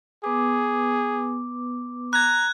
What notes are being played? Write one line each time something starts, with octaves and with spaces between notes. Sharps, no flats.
B3 G#4 B4 D6
A#5 F#6 G#6